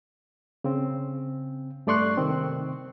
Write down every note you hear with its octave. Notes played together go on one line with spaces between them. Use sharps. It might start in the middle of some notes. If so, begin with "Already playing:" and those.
C#3 C4
G2 A3 D5 C6 C#6 F#6
C3 D#3 C4